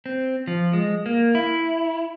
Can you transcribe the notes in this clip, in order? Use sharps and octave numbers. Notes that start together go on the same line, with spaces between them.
C4
F3
G#3
A#3
E4